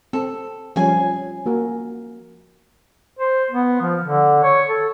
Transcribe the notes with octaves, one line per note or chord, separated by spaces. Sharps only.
C4 A4
F3 G3 C#4 G#4 G#5
A#3 F#4 A#4
C5
B3
F3
D3
C#5
A4